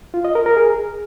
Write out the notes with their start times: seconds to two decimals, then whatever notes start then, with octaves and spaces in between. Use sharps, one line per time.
0.14 F4
0.25 D#5
0.35 A#4
0.46 A#4
0.57 G#4